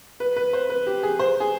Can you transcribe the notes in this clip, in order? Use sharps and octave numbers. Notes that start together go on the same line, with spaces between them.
B4
B4
C5
B4
G4
G#4
C5
G#4